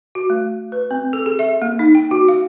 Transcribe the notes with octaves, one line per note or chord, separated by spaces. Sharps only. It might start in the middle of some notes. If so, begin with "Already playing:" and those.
F#4
A3
B4
C4
A4
G#4
E5
A#3
D#4
G5
F#4
F5